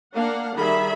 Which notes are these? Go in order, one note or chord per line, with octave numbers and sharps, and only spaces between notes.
A#3 D4 F5 F#5
D#3 G3 G#4 E5 B5